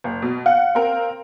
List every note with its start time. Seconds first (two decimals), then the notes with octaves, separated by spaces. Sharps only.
0.04 F#1
0.22 B2
0.46 F5 F#5
0.75 C4 A#4